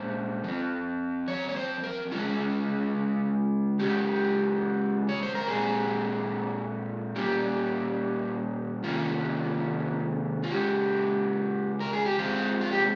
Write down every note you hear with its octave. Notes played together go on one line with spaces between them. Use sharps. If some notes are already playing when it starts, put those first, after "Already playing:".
Already playing: A#2 G#3 C#4 C5
F3 C4
C#5
C#5
C5
A#4
C#3 G#3 C#4 F4
C#3 G#3 C#4 G4
C#5
C5
A#4
A#2 G#3 C4 G#4
A#2 G3 A#3 C#4 G4
C3 D#3 A#3 C#4 F4
F4
C#3 G#3 C#4 G4
A#4
G#4
G4
F3 G#3 C4 F4
F4
G4